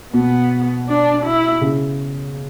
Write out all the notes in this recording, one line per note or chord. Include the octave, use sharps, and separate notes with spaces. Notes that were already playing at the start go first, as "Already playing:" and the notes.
B2 B3
D4
E4
C#3